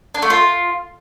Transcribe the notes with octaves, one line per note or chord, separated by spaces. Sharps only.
D4
A3
F4